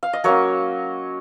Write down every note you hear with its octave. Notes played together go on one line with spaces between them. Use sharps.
F5
D#5
F#3 A#3 C#4 A#4 C#5